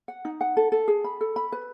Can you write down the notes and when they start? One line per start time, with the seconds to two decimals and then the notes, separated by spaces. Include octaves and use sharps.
0.08 F#5
0.25 D#4
0.41 F#5
0.57 A4
0.72 A4
0.88 G#4
1.04 B5
1.21 A4
1.36 B5
1.52 B4